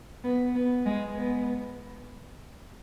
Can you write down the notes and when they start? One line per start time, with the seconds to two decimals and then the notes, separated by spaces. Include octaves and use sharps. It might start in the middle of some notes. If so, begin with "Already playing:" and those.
0.24 B3
0.55 B3
0.86 G#3
1.16 B3